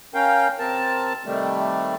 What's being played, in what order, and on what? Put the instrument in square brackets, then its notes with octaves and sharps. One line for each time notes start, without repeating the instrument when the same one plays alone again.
[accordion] C#4 A#4 F5 G5
C3 C4 A#4 A5
C3 D#3 G3 A3